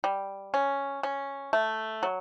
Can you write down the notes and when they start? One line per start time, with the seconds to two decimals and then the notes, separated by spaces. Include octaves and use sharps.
0.04 G3
0.54 C#4
1.03 C#4
1.53 A3
2.03 F#3